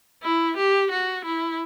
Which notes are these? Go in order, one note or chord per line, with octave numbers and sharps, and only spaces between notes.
E4
G4
F#4
E4